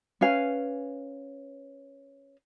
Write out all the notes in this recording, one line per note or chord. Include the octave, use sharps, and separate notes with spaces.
C#4 B4 F5 G#5